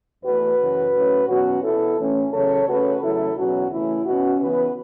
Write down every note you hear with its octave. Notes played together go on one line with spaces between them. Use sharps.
E2 E3 A3 F#4 B4
F#2 C#3 E3
A2 F#3 C#4
E2 B2 F#3 C#4 F#4
E2 B2 B3 E4 A4
A2 E3 A3 C#4
E2 C#3 F#3 A4 C#5
C#3 A3 C#4 F#4 B4
E2 C#3 F#3 A3 E4 A4
E2 B2 F#3 C#4 F#4
C#3 E3 A3 C#4 E4
B2 B3 C#4 F#4
C#3 E3 B3 F#4 B4